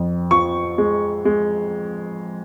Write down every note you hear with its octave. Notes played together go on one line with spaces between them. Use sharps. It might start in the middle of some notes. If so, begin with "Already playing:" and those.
Already playing: F2
F3 C#6
G#3
G#3